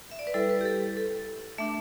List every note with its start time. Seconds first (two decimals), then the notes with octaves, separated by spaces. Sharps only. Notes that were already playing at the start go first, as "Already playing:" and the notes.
0.11 E5
0.19 D5
0.27 B4
0.34 G3 E4 A4
0.50 B4
0.61 G4
0.65 A4
0.97 A4
1.58 A3 D4 E5